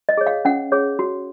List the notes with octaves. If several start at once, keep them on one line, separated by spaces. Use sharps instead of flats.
D#5
G#4 C#5
F5
C#4 F#5
G#4 C#5
F#4